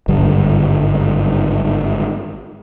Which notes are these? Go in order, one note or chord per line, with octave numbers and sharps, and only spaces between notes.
G#1 G2 D3 G3